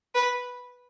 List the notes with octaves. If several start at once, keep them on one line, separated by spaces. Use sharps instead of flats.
B4